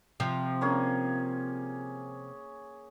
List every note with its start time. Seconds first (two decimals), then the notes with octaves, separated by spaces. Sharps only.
0.20 C3 F3
0.61 A#3 C#4 G#4